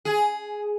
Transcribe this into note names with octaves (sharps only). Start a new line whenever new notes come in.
G#4